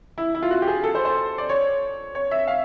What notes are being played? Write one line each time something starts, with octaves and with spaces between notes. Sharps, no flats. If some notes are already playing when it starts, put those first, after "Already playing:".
E4
E4
F4
F#4
G4
G#4
A4
C5
C5
D5
C#5
C#5
E5
F5